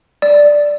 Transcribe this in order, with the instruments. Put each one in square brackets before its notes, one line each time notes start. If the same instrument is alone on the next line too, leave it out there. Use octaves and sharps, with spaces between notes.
[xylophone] D5